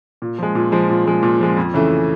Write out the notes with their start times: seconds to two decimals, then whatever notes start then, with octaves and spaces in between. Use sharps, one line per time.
0.22 A#2
0.38 F3 G#3
0.55 A#2
0.72 F3 G#3
0.90 A#2
1.06 F3 G#3
1.23 A#2
1.40 F3 G#3
1.57 F2
1.74 C#3 E3 A3